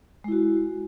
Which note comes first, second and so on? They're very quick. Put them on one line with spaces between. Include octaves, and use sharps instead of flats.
G#3 E4 F#4